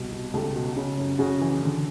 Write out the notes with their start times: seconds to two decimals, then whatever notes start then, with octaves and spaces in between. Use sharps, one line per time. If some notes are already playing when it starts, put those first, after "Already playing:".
Already playing: C2 B2
0.12 B2
0.33 C#2 G4 A4
0.56 B2
0.77 C#3
0.98 F#2
1.19 C#3 F#4 G#4
1.41 E3
1.63 D3